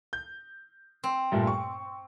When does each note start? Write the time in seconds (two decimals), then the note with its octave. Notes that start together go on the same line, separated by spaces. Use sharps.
0.13 G6
1.04 C4
1.32 G2 A#2 A3
1.47 C#6